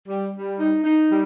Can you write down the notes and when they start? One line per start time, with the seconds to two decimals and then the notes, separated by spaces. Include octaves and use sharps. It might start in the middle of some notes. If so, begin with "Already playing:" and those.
0.08 G3
0.34 G3
0.59 D#4
0.84 D#4
1.10 G3